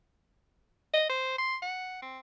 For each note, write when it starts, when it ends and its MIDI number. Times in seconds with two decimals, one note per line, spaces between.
0.93 1.08 75
1.09 1.38 72
1.38 1.56 84
1.62 2.01 78
2.02 2.19 60